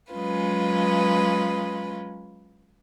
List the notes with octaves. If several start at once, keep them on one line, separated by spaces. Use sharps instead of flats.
F#3 G#3 C#4 F4 B4